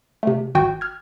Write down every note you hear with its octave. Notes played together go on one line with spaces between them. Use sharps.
C3 A3
G#1 F#4 G5 G6
F6 G#6